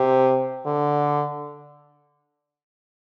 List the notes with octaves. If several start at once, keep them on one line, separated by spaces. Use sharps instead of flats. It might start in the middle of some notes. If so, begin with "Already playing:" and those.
Already playing: C3
D3